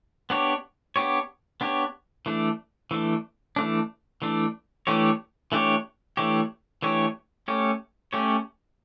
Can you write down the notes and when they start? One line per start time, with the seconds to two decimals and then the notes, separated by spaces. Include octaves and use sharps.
0.30 B3 D4 G4 C#5
0.96 B3 D4 G4 C#5
1.61 B3 D4 G4 C#5
2.26 E3 A3 D4
2.91 E3 A3 D4
3.56 E3 A3 D4
4.22 E3 A3 D4
4.87 E3 A3 D4 G4 C#5
5.52 E3 A3 D4 G4 C#5
6.17 E3 A3 D4 G4 C#5
6.82 E3 A3 D4 G4 C#5
7.48 A3 C#4 G4 C#5
8.13 A3 C#4 G4 C#5